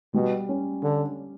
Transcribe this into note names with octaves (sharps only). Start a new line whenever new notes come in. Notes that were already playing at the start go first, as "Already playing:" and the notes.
B2 G3
C#4
D3